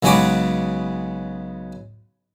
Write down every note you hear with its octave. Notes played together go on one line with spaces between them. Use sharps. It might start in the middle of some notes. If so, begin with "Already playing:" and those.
B1 C#3 G#3 F#4 B4 D6